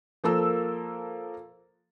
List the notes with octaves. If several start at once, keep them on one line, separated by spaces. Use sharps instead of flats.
F3 A#3 A4 A#4 E6